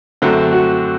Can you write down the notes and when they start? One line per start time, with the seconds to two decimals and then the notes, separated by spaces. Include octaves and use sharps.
0.22 F#2 D3 A3 C4 F#4
0.52 F#4